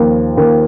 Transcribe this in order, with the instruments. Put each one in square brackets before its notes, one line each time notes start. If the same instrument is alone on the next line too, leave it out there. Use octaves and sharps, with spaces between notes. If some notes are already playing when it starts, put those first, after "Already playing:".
Already playing: [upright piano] D#2 F3
D#2